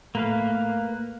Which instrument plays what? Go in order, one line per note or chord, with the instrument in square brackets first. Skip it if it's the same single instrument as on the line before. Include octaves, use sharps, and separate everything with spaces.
[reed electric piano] A2 A3 [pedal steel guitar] A#3 B4 F5